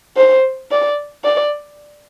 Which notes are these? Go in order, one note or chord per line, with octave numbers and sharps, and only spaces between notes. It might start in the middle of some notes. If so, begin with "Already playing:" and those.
C5
D5
D5